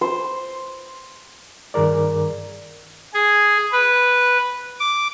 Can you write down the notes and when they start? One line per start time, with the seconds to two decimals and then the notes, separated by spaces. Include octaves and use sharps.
0.01 C5
1.74 G2 D#3 G#4 A#4 D5
3.14 G#4
3.72 B4
4.79 D6